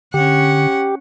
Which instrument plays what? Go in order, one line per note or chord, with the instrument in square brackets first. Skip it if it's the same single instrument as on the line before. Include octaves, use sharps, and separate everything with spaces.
[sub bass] D3 [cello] C#4 F#5 [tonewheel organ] G4